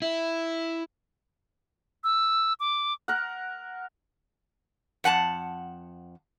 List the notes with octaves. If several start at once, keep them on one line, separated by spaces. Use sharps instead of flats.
E4
E6
D6
A#4 F#5
F2 F#5 G#5 A5